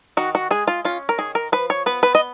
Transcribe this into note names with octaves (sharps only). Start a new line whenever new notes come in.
D#3 F#4
F#4
G#3 G#4
F4
C#4 F4
A#4
D#3 G#4
A#4
F3 B4
C#5
B3 B4
B4
D#5